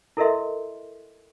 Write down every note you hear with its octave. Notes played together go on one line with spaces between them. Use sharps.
E4 A4 A#4 D#5 E5 C6